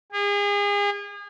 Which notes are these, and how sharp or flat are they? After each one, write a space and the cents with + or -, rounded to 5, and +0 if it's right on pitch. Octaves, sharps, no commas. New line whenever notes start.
G#4 -35